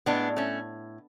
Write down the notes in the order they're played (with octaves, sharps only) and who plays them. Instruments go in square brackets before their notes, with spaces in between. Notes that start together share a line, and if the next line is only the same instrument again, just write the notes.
[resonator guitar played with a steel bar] A2 G#3 B3 D4
A3 C#4